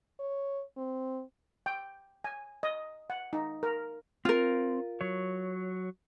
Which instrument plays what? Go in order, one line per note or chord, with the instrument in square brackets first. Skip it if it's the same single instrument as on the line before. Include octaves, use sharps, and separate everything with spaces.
[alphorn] C#5
C4
[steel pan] G5
G#5
D#5
F#5
D#4
A#4
[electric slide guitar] C4 [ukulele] F4 A#4
[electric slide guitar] F#3 C#5